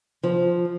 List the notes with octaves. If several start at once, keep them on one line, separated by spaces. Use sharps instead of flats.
F3